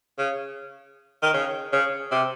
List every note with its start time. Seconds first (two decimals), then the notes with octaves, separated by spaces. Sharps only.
0.18 C#3
1.23 D#3
1.34 C#3
1.73 C#3
2.11 C3